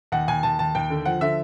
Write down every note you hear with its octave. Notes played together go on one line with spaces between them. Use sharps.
D#2 F#5
D#2 G#5
D#2 A5
D#2 A5
D#2 G5
D3
F3 F#5
D3 E5